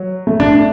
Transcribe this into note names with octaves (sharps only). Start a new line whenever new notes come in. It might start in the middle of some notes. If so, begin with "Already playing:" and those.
Already playing: F#3
A3
D4